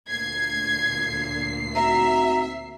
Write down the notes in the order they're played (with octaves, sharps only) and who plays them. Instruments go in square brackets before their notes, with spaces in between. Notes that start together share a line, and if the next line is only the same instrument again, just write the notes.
[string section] D2 A#2 C7 [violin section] G#6
[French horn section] C4 D#4 F#4 [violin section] E5 [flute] A#5